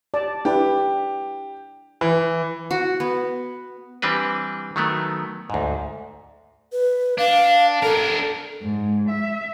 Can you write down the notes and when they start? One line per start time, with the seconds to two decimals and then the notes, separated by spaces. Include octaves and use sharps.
0.14 D5 A5
0.45 D4 E4 G4 B4
2.01 E3
2.71 F#4
3.00 B3
4.02 E3 G3 C4 D4 B4
4.76 D#3 F#3 A3 B3
5.50 D2 G#2
6.72 B4
7.18 D4 F5
7.83 D4 A4 A#4
8.63 G#2
9.10 E5